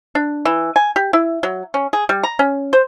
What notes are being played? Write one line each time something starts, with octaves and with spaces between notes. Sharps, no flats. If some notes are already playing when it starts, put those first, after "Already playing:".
D4
E3
G#5
G4
E4
F#3
C#4
G#4
G3
A#5
C#4
C5